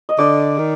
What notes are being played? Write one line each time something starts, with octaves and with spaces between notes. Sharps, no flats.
D#5
D3 D5
D#3